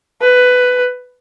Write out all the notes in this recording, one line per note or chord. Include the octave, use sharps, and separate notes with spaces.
B4